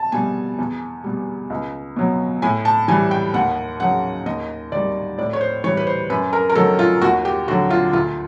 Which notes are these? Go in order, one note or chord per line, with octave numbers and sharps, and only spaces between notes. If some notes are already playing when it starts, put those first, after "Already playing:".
Already playing: A5
B2 G3 G#5
E2
B2 G3
C#2
B2 F#3
A2 G#5
A5
E3 G3 G#5
G5
D#2 F#5
C#3 F#3 F#5
D#2 D#5
D#3 G3 D5
A2 D5
C#5
C5
E3 G3 C#5
B4
C5
F#2 B4
A#4
A#4
D#3 F#3 A4
F4
D#2 F#4
G4
D3 F#3 F#4
F4
D2 F4